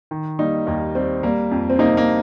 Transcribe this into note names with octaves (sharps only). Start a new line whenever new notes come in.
D#3
G3 A#3 D#4
D#2 A#3
G3 C4
G3 A#3
F2
C4
C3 A#3 D#4
A#3